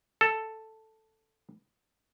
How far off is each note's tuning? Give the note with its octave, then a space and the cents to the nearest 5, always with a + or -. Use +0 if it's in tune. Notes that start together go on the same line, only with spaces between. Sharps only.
A4 +5